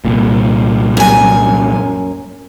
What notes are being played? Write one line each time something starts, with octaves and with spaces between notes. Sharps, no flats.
C2 A#2
F#2 G#5